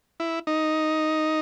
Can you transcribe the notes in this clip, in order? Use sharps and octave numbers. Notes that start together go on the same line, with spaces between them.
E4
D#4